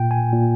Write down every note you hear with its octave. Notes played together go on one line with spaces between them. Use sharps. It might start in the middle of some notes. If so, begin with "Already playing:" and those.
Already playing: A#2 G5
G#5
A#2